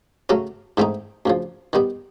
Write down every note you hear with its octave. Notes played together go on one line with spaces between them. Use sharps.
C#3 F#3 A3 C#4
G#2 E3 A3 C4 D#4
D2 C#3 F3
D#3 G3 B3